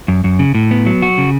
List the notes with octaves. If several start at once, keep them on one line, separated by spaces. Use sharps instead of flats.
F#2
F#2
C#3
A2
B3
F#3
F#4
C#3